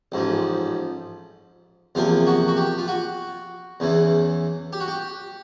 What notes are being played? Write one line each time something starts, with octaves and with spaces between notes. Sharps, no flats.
A1 G#2 F3
E2 C3 F3 A#3 F4
F#4
F#4
G4
F4
F#4
E2 C#3 E3
G4
F#4
G4